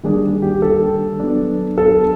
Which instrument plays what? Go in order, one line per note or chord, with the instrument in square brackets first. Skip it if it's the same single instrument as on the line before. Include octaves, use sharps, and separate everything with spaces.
[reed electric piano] D#3 G3 A#3 D4 [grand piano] G#4
[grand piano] G4
A4
[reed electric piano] F#3 B3 D4
[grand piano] A4